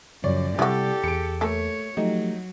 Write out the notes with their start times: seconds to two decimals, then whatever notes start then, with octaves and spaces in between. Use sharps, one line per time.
0.24 F#2 C#3 F3 C#5 D5
0.59 C3 G3 E4 F#4 G4 A4
1.04 E2 G#4 C#7 D7
1.41 A3 A#3 A4 C#5
1.97 F3 F#3 A3 D#4 G4